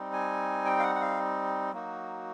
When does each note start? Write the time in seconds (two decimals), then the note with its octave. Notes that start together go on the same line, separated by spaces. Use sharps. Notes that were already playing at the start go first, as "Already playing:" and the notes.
Already playing: G3 C4 D#4
0.13 G#5
0.65 G5
0.79 F5
0.83 F#5
0.95 F#5
1.01 F5
1.73 F#3 A#3 D#4 F#4